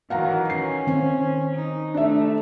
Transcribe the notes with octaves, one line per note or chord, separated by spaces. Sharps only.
D#3 E3 F#3 F5 F#5 A#5
C#4 C7
D#3 C4 C5
D#4
C3 A3 D4 E5